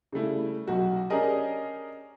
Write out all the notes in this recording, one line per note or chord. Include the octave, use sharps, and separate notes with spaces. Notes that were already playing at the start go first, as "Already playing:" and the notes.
C#3 G3 A3 E4
B1 F#4
C#4 D4 G4 G#4 A#4 D#5